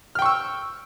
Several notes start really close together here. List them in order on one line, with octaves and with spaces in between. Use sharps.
F6 G5 C#6 E6